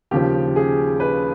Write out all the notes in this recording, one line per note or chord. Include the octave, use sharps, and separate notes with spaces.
D#2 C#3 F3 G4
G#4
B4